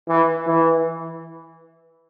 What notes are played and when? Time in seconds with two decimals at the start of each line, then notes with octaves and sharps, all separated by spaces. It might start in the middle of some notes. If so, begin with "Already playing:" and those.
0.09 E3
0.47 E3